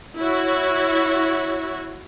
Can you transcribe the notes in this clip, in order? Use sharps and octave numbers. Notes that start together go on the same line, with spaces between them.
E4 F#4 C#5